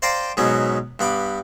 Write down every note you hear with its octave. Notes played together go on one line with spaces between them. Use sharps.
C5 D5 F5 G5 A#5
G#2 B2 F#3 B3 C#4
G2 B3 B5 D6